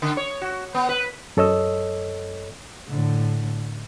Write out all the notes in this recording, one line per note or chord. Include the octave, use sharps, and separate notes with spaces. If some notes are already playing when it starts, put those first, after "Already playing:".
D3
C#5
F#4
B3
B4
F#2 A4 C#5 D#5 E6
A2 D3